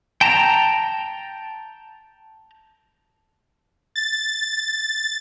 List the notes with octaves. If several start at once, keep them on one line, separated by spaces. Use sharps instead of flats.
G5 A5 A#5
A6